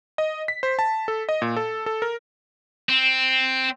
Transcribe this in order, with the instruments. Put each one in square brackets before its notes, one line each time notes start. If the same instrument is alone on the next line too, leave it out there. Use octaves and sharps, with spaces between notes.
[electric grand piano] D#5
B6
C5
A5
A4
D#5
A#2
A4
A4
A#4
[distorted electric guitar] C4